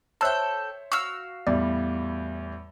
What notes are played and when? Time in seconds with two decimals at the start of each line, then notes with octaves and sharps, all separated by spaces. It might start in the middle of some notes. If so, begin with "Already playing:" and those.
0.21 A4 C5 C#5 E5 G5 A5 E6 F#6
0.92 F#4 F5 C#6 E6 F6
1.47 E2 A2 G3 D5